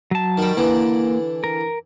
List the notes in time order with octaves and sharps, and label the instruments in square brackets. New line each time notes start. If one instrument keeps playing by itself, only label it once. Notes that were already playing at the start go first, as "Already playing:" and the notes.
[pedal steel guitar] F#3 A5
[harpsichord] D#3 G3
[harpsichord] D3 E3 [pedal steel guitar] A#3
[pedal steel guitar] A#4